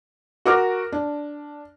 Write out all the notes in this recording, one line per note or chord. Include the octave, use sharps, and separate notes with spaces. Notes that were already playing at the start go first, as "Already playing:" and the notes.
F#4 A#4 D6 F6
D4